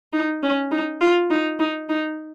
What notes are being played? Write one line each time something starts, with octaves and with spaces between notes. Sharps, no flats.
D#4
C#4
D#4
F4
D#4
D#4
D#4